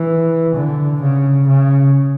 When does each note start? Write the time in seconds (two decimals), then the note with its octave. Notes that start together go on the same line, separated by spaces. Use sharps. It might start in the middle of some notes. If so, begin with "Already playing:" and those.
Already playing: E3
0.55 D3
1.01 C#3
1.47 C#3